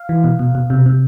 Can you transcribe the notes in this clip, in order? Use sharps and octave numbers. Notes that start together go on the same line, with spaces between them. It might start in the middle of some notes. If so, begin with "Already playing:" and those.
Already playing: F5
E3
B2
B2
B2
C3
C3